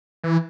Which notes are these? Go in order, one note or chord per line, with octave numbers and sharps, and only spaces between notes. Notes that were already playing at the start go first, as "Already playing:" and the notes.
E3